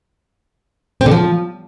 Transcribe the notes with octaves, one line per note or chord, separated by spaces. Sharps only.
C4
D3
F3